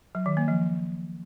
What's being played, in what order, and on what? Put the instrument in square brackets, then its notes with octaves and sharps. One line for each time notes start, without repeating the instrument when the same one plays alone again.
[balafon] F#3
D#3
A#3
F3